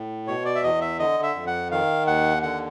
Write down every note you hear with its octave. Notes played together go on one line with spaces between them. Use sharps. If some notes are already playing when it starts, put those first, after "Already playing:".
Already playing: A2
B2 C#5
D5
E5
E2 D#5
E5
D3 D#5
E5
F2
F#5
D#3 F5
D#2 F#5
D3 F#5